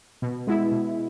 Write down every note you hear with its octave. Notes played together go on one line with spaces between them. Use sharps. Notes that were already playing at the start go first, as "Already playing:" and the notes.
B2
G#3 B3 E4
B2